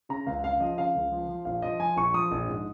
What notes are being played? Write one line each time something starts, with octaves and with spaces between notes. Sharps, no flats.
C#3 A#5
C#2 F5
C#3 F5
F3 D#5
C#3 F5
C#2
F3
F3
A#1 F5
F3 D#5
F3 G#5
A#1 C#6
F3 D#6
A#1
G#2